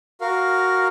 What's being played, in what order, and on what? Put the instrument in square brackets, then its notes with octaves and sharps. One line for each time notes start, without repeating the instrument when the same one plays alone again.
[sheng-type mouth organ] F#4 A#4 F5